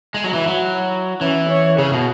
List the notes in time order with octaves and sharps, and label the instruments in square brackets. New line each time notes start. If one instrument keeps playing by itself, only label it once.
[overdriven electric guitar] G#3
F#3
[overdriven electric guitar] E3 [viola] E4
[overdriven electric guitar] F#3
[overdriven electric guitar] E3 [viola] C#4
[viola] C#5
[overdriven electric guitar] C#3 [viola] G#4
[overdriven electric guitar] B2